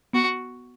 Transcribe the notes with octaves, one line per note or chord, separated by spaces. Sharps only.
B3 F#4